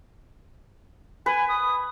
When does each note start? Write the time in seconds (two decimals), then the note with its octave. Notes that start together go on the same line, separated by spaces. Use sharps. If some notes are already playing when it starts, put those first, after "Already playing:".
1.26 B4 G#5
1.49 D#6